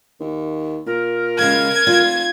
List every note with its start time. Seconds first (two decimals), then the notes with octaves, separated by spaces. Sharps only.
0.20 D#2
0.86 A#2 A#4
1.39 C#3 G#3 F5 G#6
1.87 F1 F4 D5